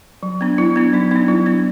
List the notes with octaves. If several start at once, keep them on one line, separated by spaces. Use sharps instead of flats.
F#3
B3 D4
F#3 E4
B3 D4
F#3 D#4
B3 D4 D#4
F#3 E4
B3 D4